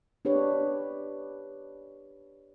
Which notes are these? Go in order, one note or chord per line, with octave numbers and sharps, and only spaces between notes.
D4 G4 B4 C#5